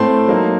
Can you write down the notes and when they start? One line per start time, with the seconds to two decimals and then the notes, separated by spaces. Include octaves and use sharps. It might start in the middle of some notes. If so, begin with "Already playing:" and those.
Already playing: A2 A3 C4 A5 C6
0.28 F#3 A#3 D#4